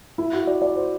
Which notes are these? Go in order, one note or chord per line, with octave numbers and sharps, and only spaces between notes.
E4
F#4
D5
D5
C5